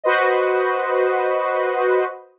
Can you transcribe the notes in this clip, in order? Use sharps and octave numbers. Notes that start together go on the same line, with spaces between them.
F#4 B4 C5 D#5